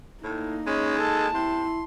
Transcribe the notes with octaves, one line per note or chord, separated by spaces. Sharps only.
A2 A#3 D#4
G#3 C#4 B5
A4 A5
C3 E4 C6